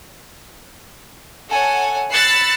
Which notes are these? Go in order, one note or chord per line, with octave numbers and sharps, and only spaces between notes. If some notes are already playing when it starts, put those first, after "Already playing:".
A4 C#5 F#5 G#5
B5 E6 F#6 A6 C7 C#7